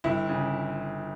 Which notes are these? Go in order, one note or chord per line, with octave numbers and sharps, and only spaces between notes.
G1 E4
C#3